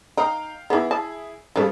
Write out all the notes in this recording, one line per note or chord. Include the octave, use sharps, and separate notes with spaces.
D#4 F5 G5
E3 B3 E4 G#4
A5
C#3 F3 G3 A4